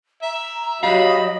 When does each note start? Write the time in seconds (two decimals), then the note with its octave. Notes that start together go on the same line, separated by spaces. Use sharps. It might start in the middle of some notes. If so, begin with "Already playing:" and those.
0.23 E5 A#5
0.83 F#3 F#4 G4 D#5 F5 B5